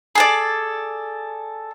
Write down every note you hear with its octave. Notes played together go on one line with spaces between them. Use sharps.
G#4 A4 D5